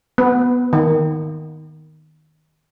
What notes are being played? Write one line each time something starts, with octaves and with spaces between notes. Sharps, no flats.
B3
D#3